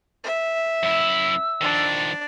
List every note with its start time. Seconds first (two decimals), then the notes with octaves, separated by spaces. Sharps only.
0.24 E5
0.83 F#2 E4 E6
1.61 D#3 F3 D4 D5